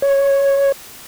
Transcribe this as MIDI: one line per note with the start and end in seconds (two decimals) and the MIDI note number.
0.02 0.72 73